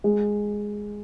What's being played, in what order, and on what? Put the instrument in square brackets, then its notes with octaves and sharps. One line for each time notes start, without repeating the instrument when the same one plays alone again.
[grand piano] G#3